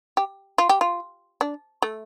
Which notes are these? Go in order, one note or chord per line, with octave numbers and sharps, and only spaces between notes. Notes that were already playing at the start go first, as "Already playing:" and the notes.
G4
F4
G4
F4
D4
A3